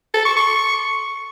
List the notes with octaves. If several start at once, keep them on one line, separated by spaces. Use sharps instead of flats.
A4
C#6
C#6